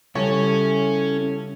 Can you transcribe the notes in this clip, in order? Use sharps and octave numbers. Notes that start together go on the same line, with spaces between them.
C#3 G3 C#4 E4 F4 A4 C#5